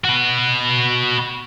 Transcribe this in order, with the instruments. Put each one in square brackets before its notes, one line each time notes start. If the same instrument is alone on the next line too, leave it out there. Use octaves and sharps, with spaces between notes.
[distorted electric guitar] F#4 B4